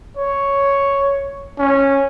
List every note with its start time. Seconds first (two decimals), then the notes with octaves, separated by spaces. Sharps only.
0.17 C#5
1.58 C#4